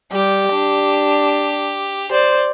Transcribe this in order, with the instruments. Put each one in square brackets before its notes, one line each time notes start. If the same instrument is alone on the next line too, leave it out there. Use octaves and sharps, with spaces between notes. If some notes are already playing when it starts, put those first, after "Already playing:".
[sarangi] G3 [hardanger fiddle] G4
[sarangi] D4
[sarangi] C5 [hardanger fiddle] D5